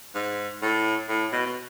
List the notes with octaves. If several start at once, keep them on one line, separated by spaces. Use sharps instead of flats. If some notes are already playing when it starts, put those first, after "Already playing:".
G#2
A2
A2
B2
B2